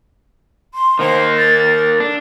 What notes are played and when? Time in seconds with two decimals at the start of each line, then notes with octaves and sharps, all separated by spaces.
0.74 C6
0.99 D#3 A#3 C5
1.38 A6
2.00 D4 A4